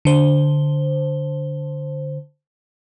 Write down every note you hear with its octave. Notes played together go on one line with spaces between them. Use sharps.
D3 C5